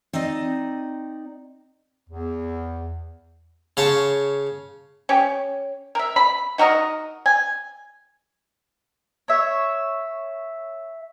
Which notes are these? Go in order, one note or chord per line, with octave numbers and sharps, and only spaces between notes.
C4 D#4 D5 D#5
E2
C#3 C#5 A5 C6
C#4 G4
A#4 E5
B5
D#4 F#4 A#4 D#5
G#5
C#5 E5